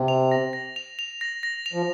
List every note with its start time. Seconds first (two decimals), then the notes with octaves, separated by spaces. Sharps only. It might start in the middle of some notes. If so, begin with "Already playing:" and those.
Already playing: C3
0.08 F7
0.31 A#6
0.53 A#6
0.76 F7
0.99 F7
1.21 A#6
1.43 A#6
1.66 F7
1.73 F3